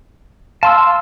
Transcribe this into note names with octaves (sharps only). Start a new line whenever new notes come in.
F5 A5 C6 E6